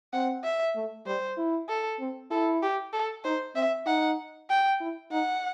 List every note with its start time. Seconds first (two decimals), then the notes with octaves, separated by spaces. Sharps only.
0.13 C4 F#5
0.44 E5
0.75 A3
1.06 G3 C5
1.37 E4
1.69 A4
2.00 C4
2.31 E4 A4
2.62 G4
2.93 A4
3.24 D#4 C5
3.55 C4 E5
3.86 D#4 F#5
4.49 G5
4.80 E4
5.11 D#4 F#5